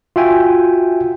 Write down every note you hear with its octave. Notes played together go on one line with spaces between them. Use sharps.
F4 F#4 E5 G5 G#5